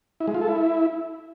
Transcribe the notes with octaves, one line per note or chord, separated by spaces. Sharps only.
E4
G#3
F4
A4
E4